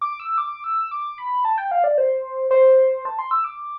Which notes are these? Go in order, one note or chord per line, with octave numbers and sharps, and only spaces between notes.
D6
E6
D6
E6
D6
B5
A5
G5
F5
D5
C5
C5
A5
C6
E6
D6